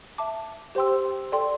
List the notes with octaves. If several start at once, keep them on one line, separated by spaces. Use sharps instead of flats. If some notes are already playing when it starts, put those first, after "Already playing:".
E5 A5 D6
G4 C5 G5 C6 E6
A4 D5 G5 C6